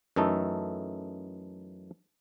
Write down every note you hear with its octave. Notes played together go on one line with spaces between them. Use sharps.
F#2 E3 A3 D#4 A4